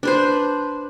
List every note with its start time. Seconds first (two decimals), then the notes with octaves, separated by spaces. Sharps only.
0.03 D4 B4 C5